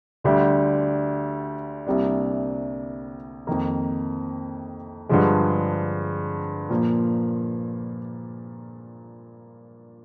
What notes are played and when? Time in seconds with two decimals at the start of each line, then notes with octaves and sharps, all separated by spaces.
0.24 D2 D3 G3 D4 G4
1.87 C2 C3 G3 A#3 D4
3.47 F2 D#3 A#3
5.09 G2 D3 F3 G#3
6.70 A#2 F3 A#3